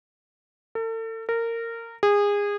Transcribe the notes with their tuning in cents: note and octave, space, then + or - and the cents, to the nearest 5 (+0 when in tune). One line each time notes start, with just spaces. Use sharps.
A4 +40
A#4 -20
G#4 -25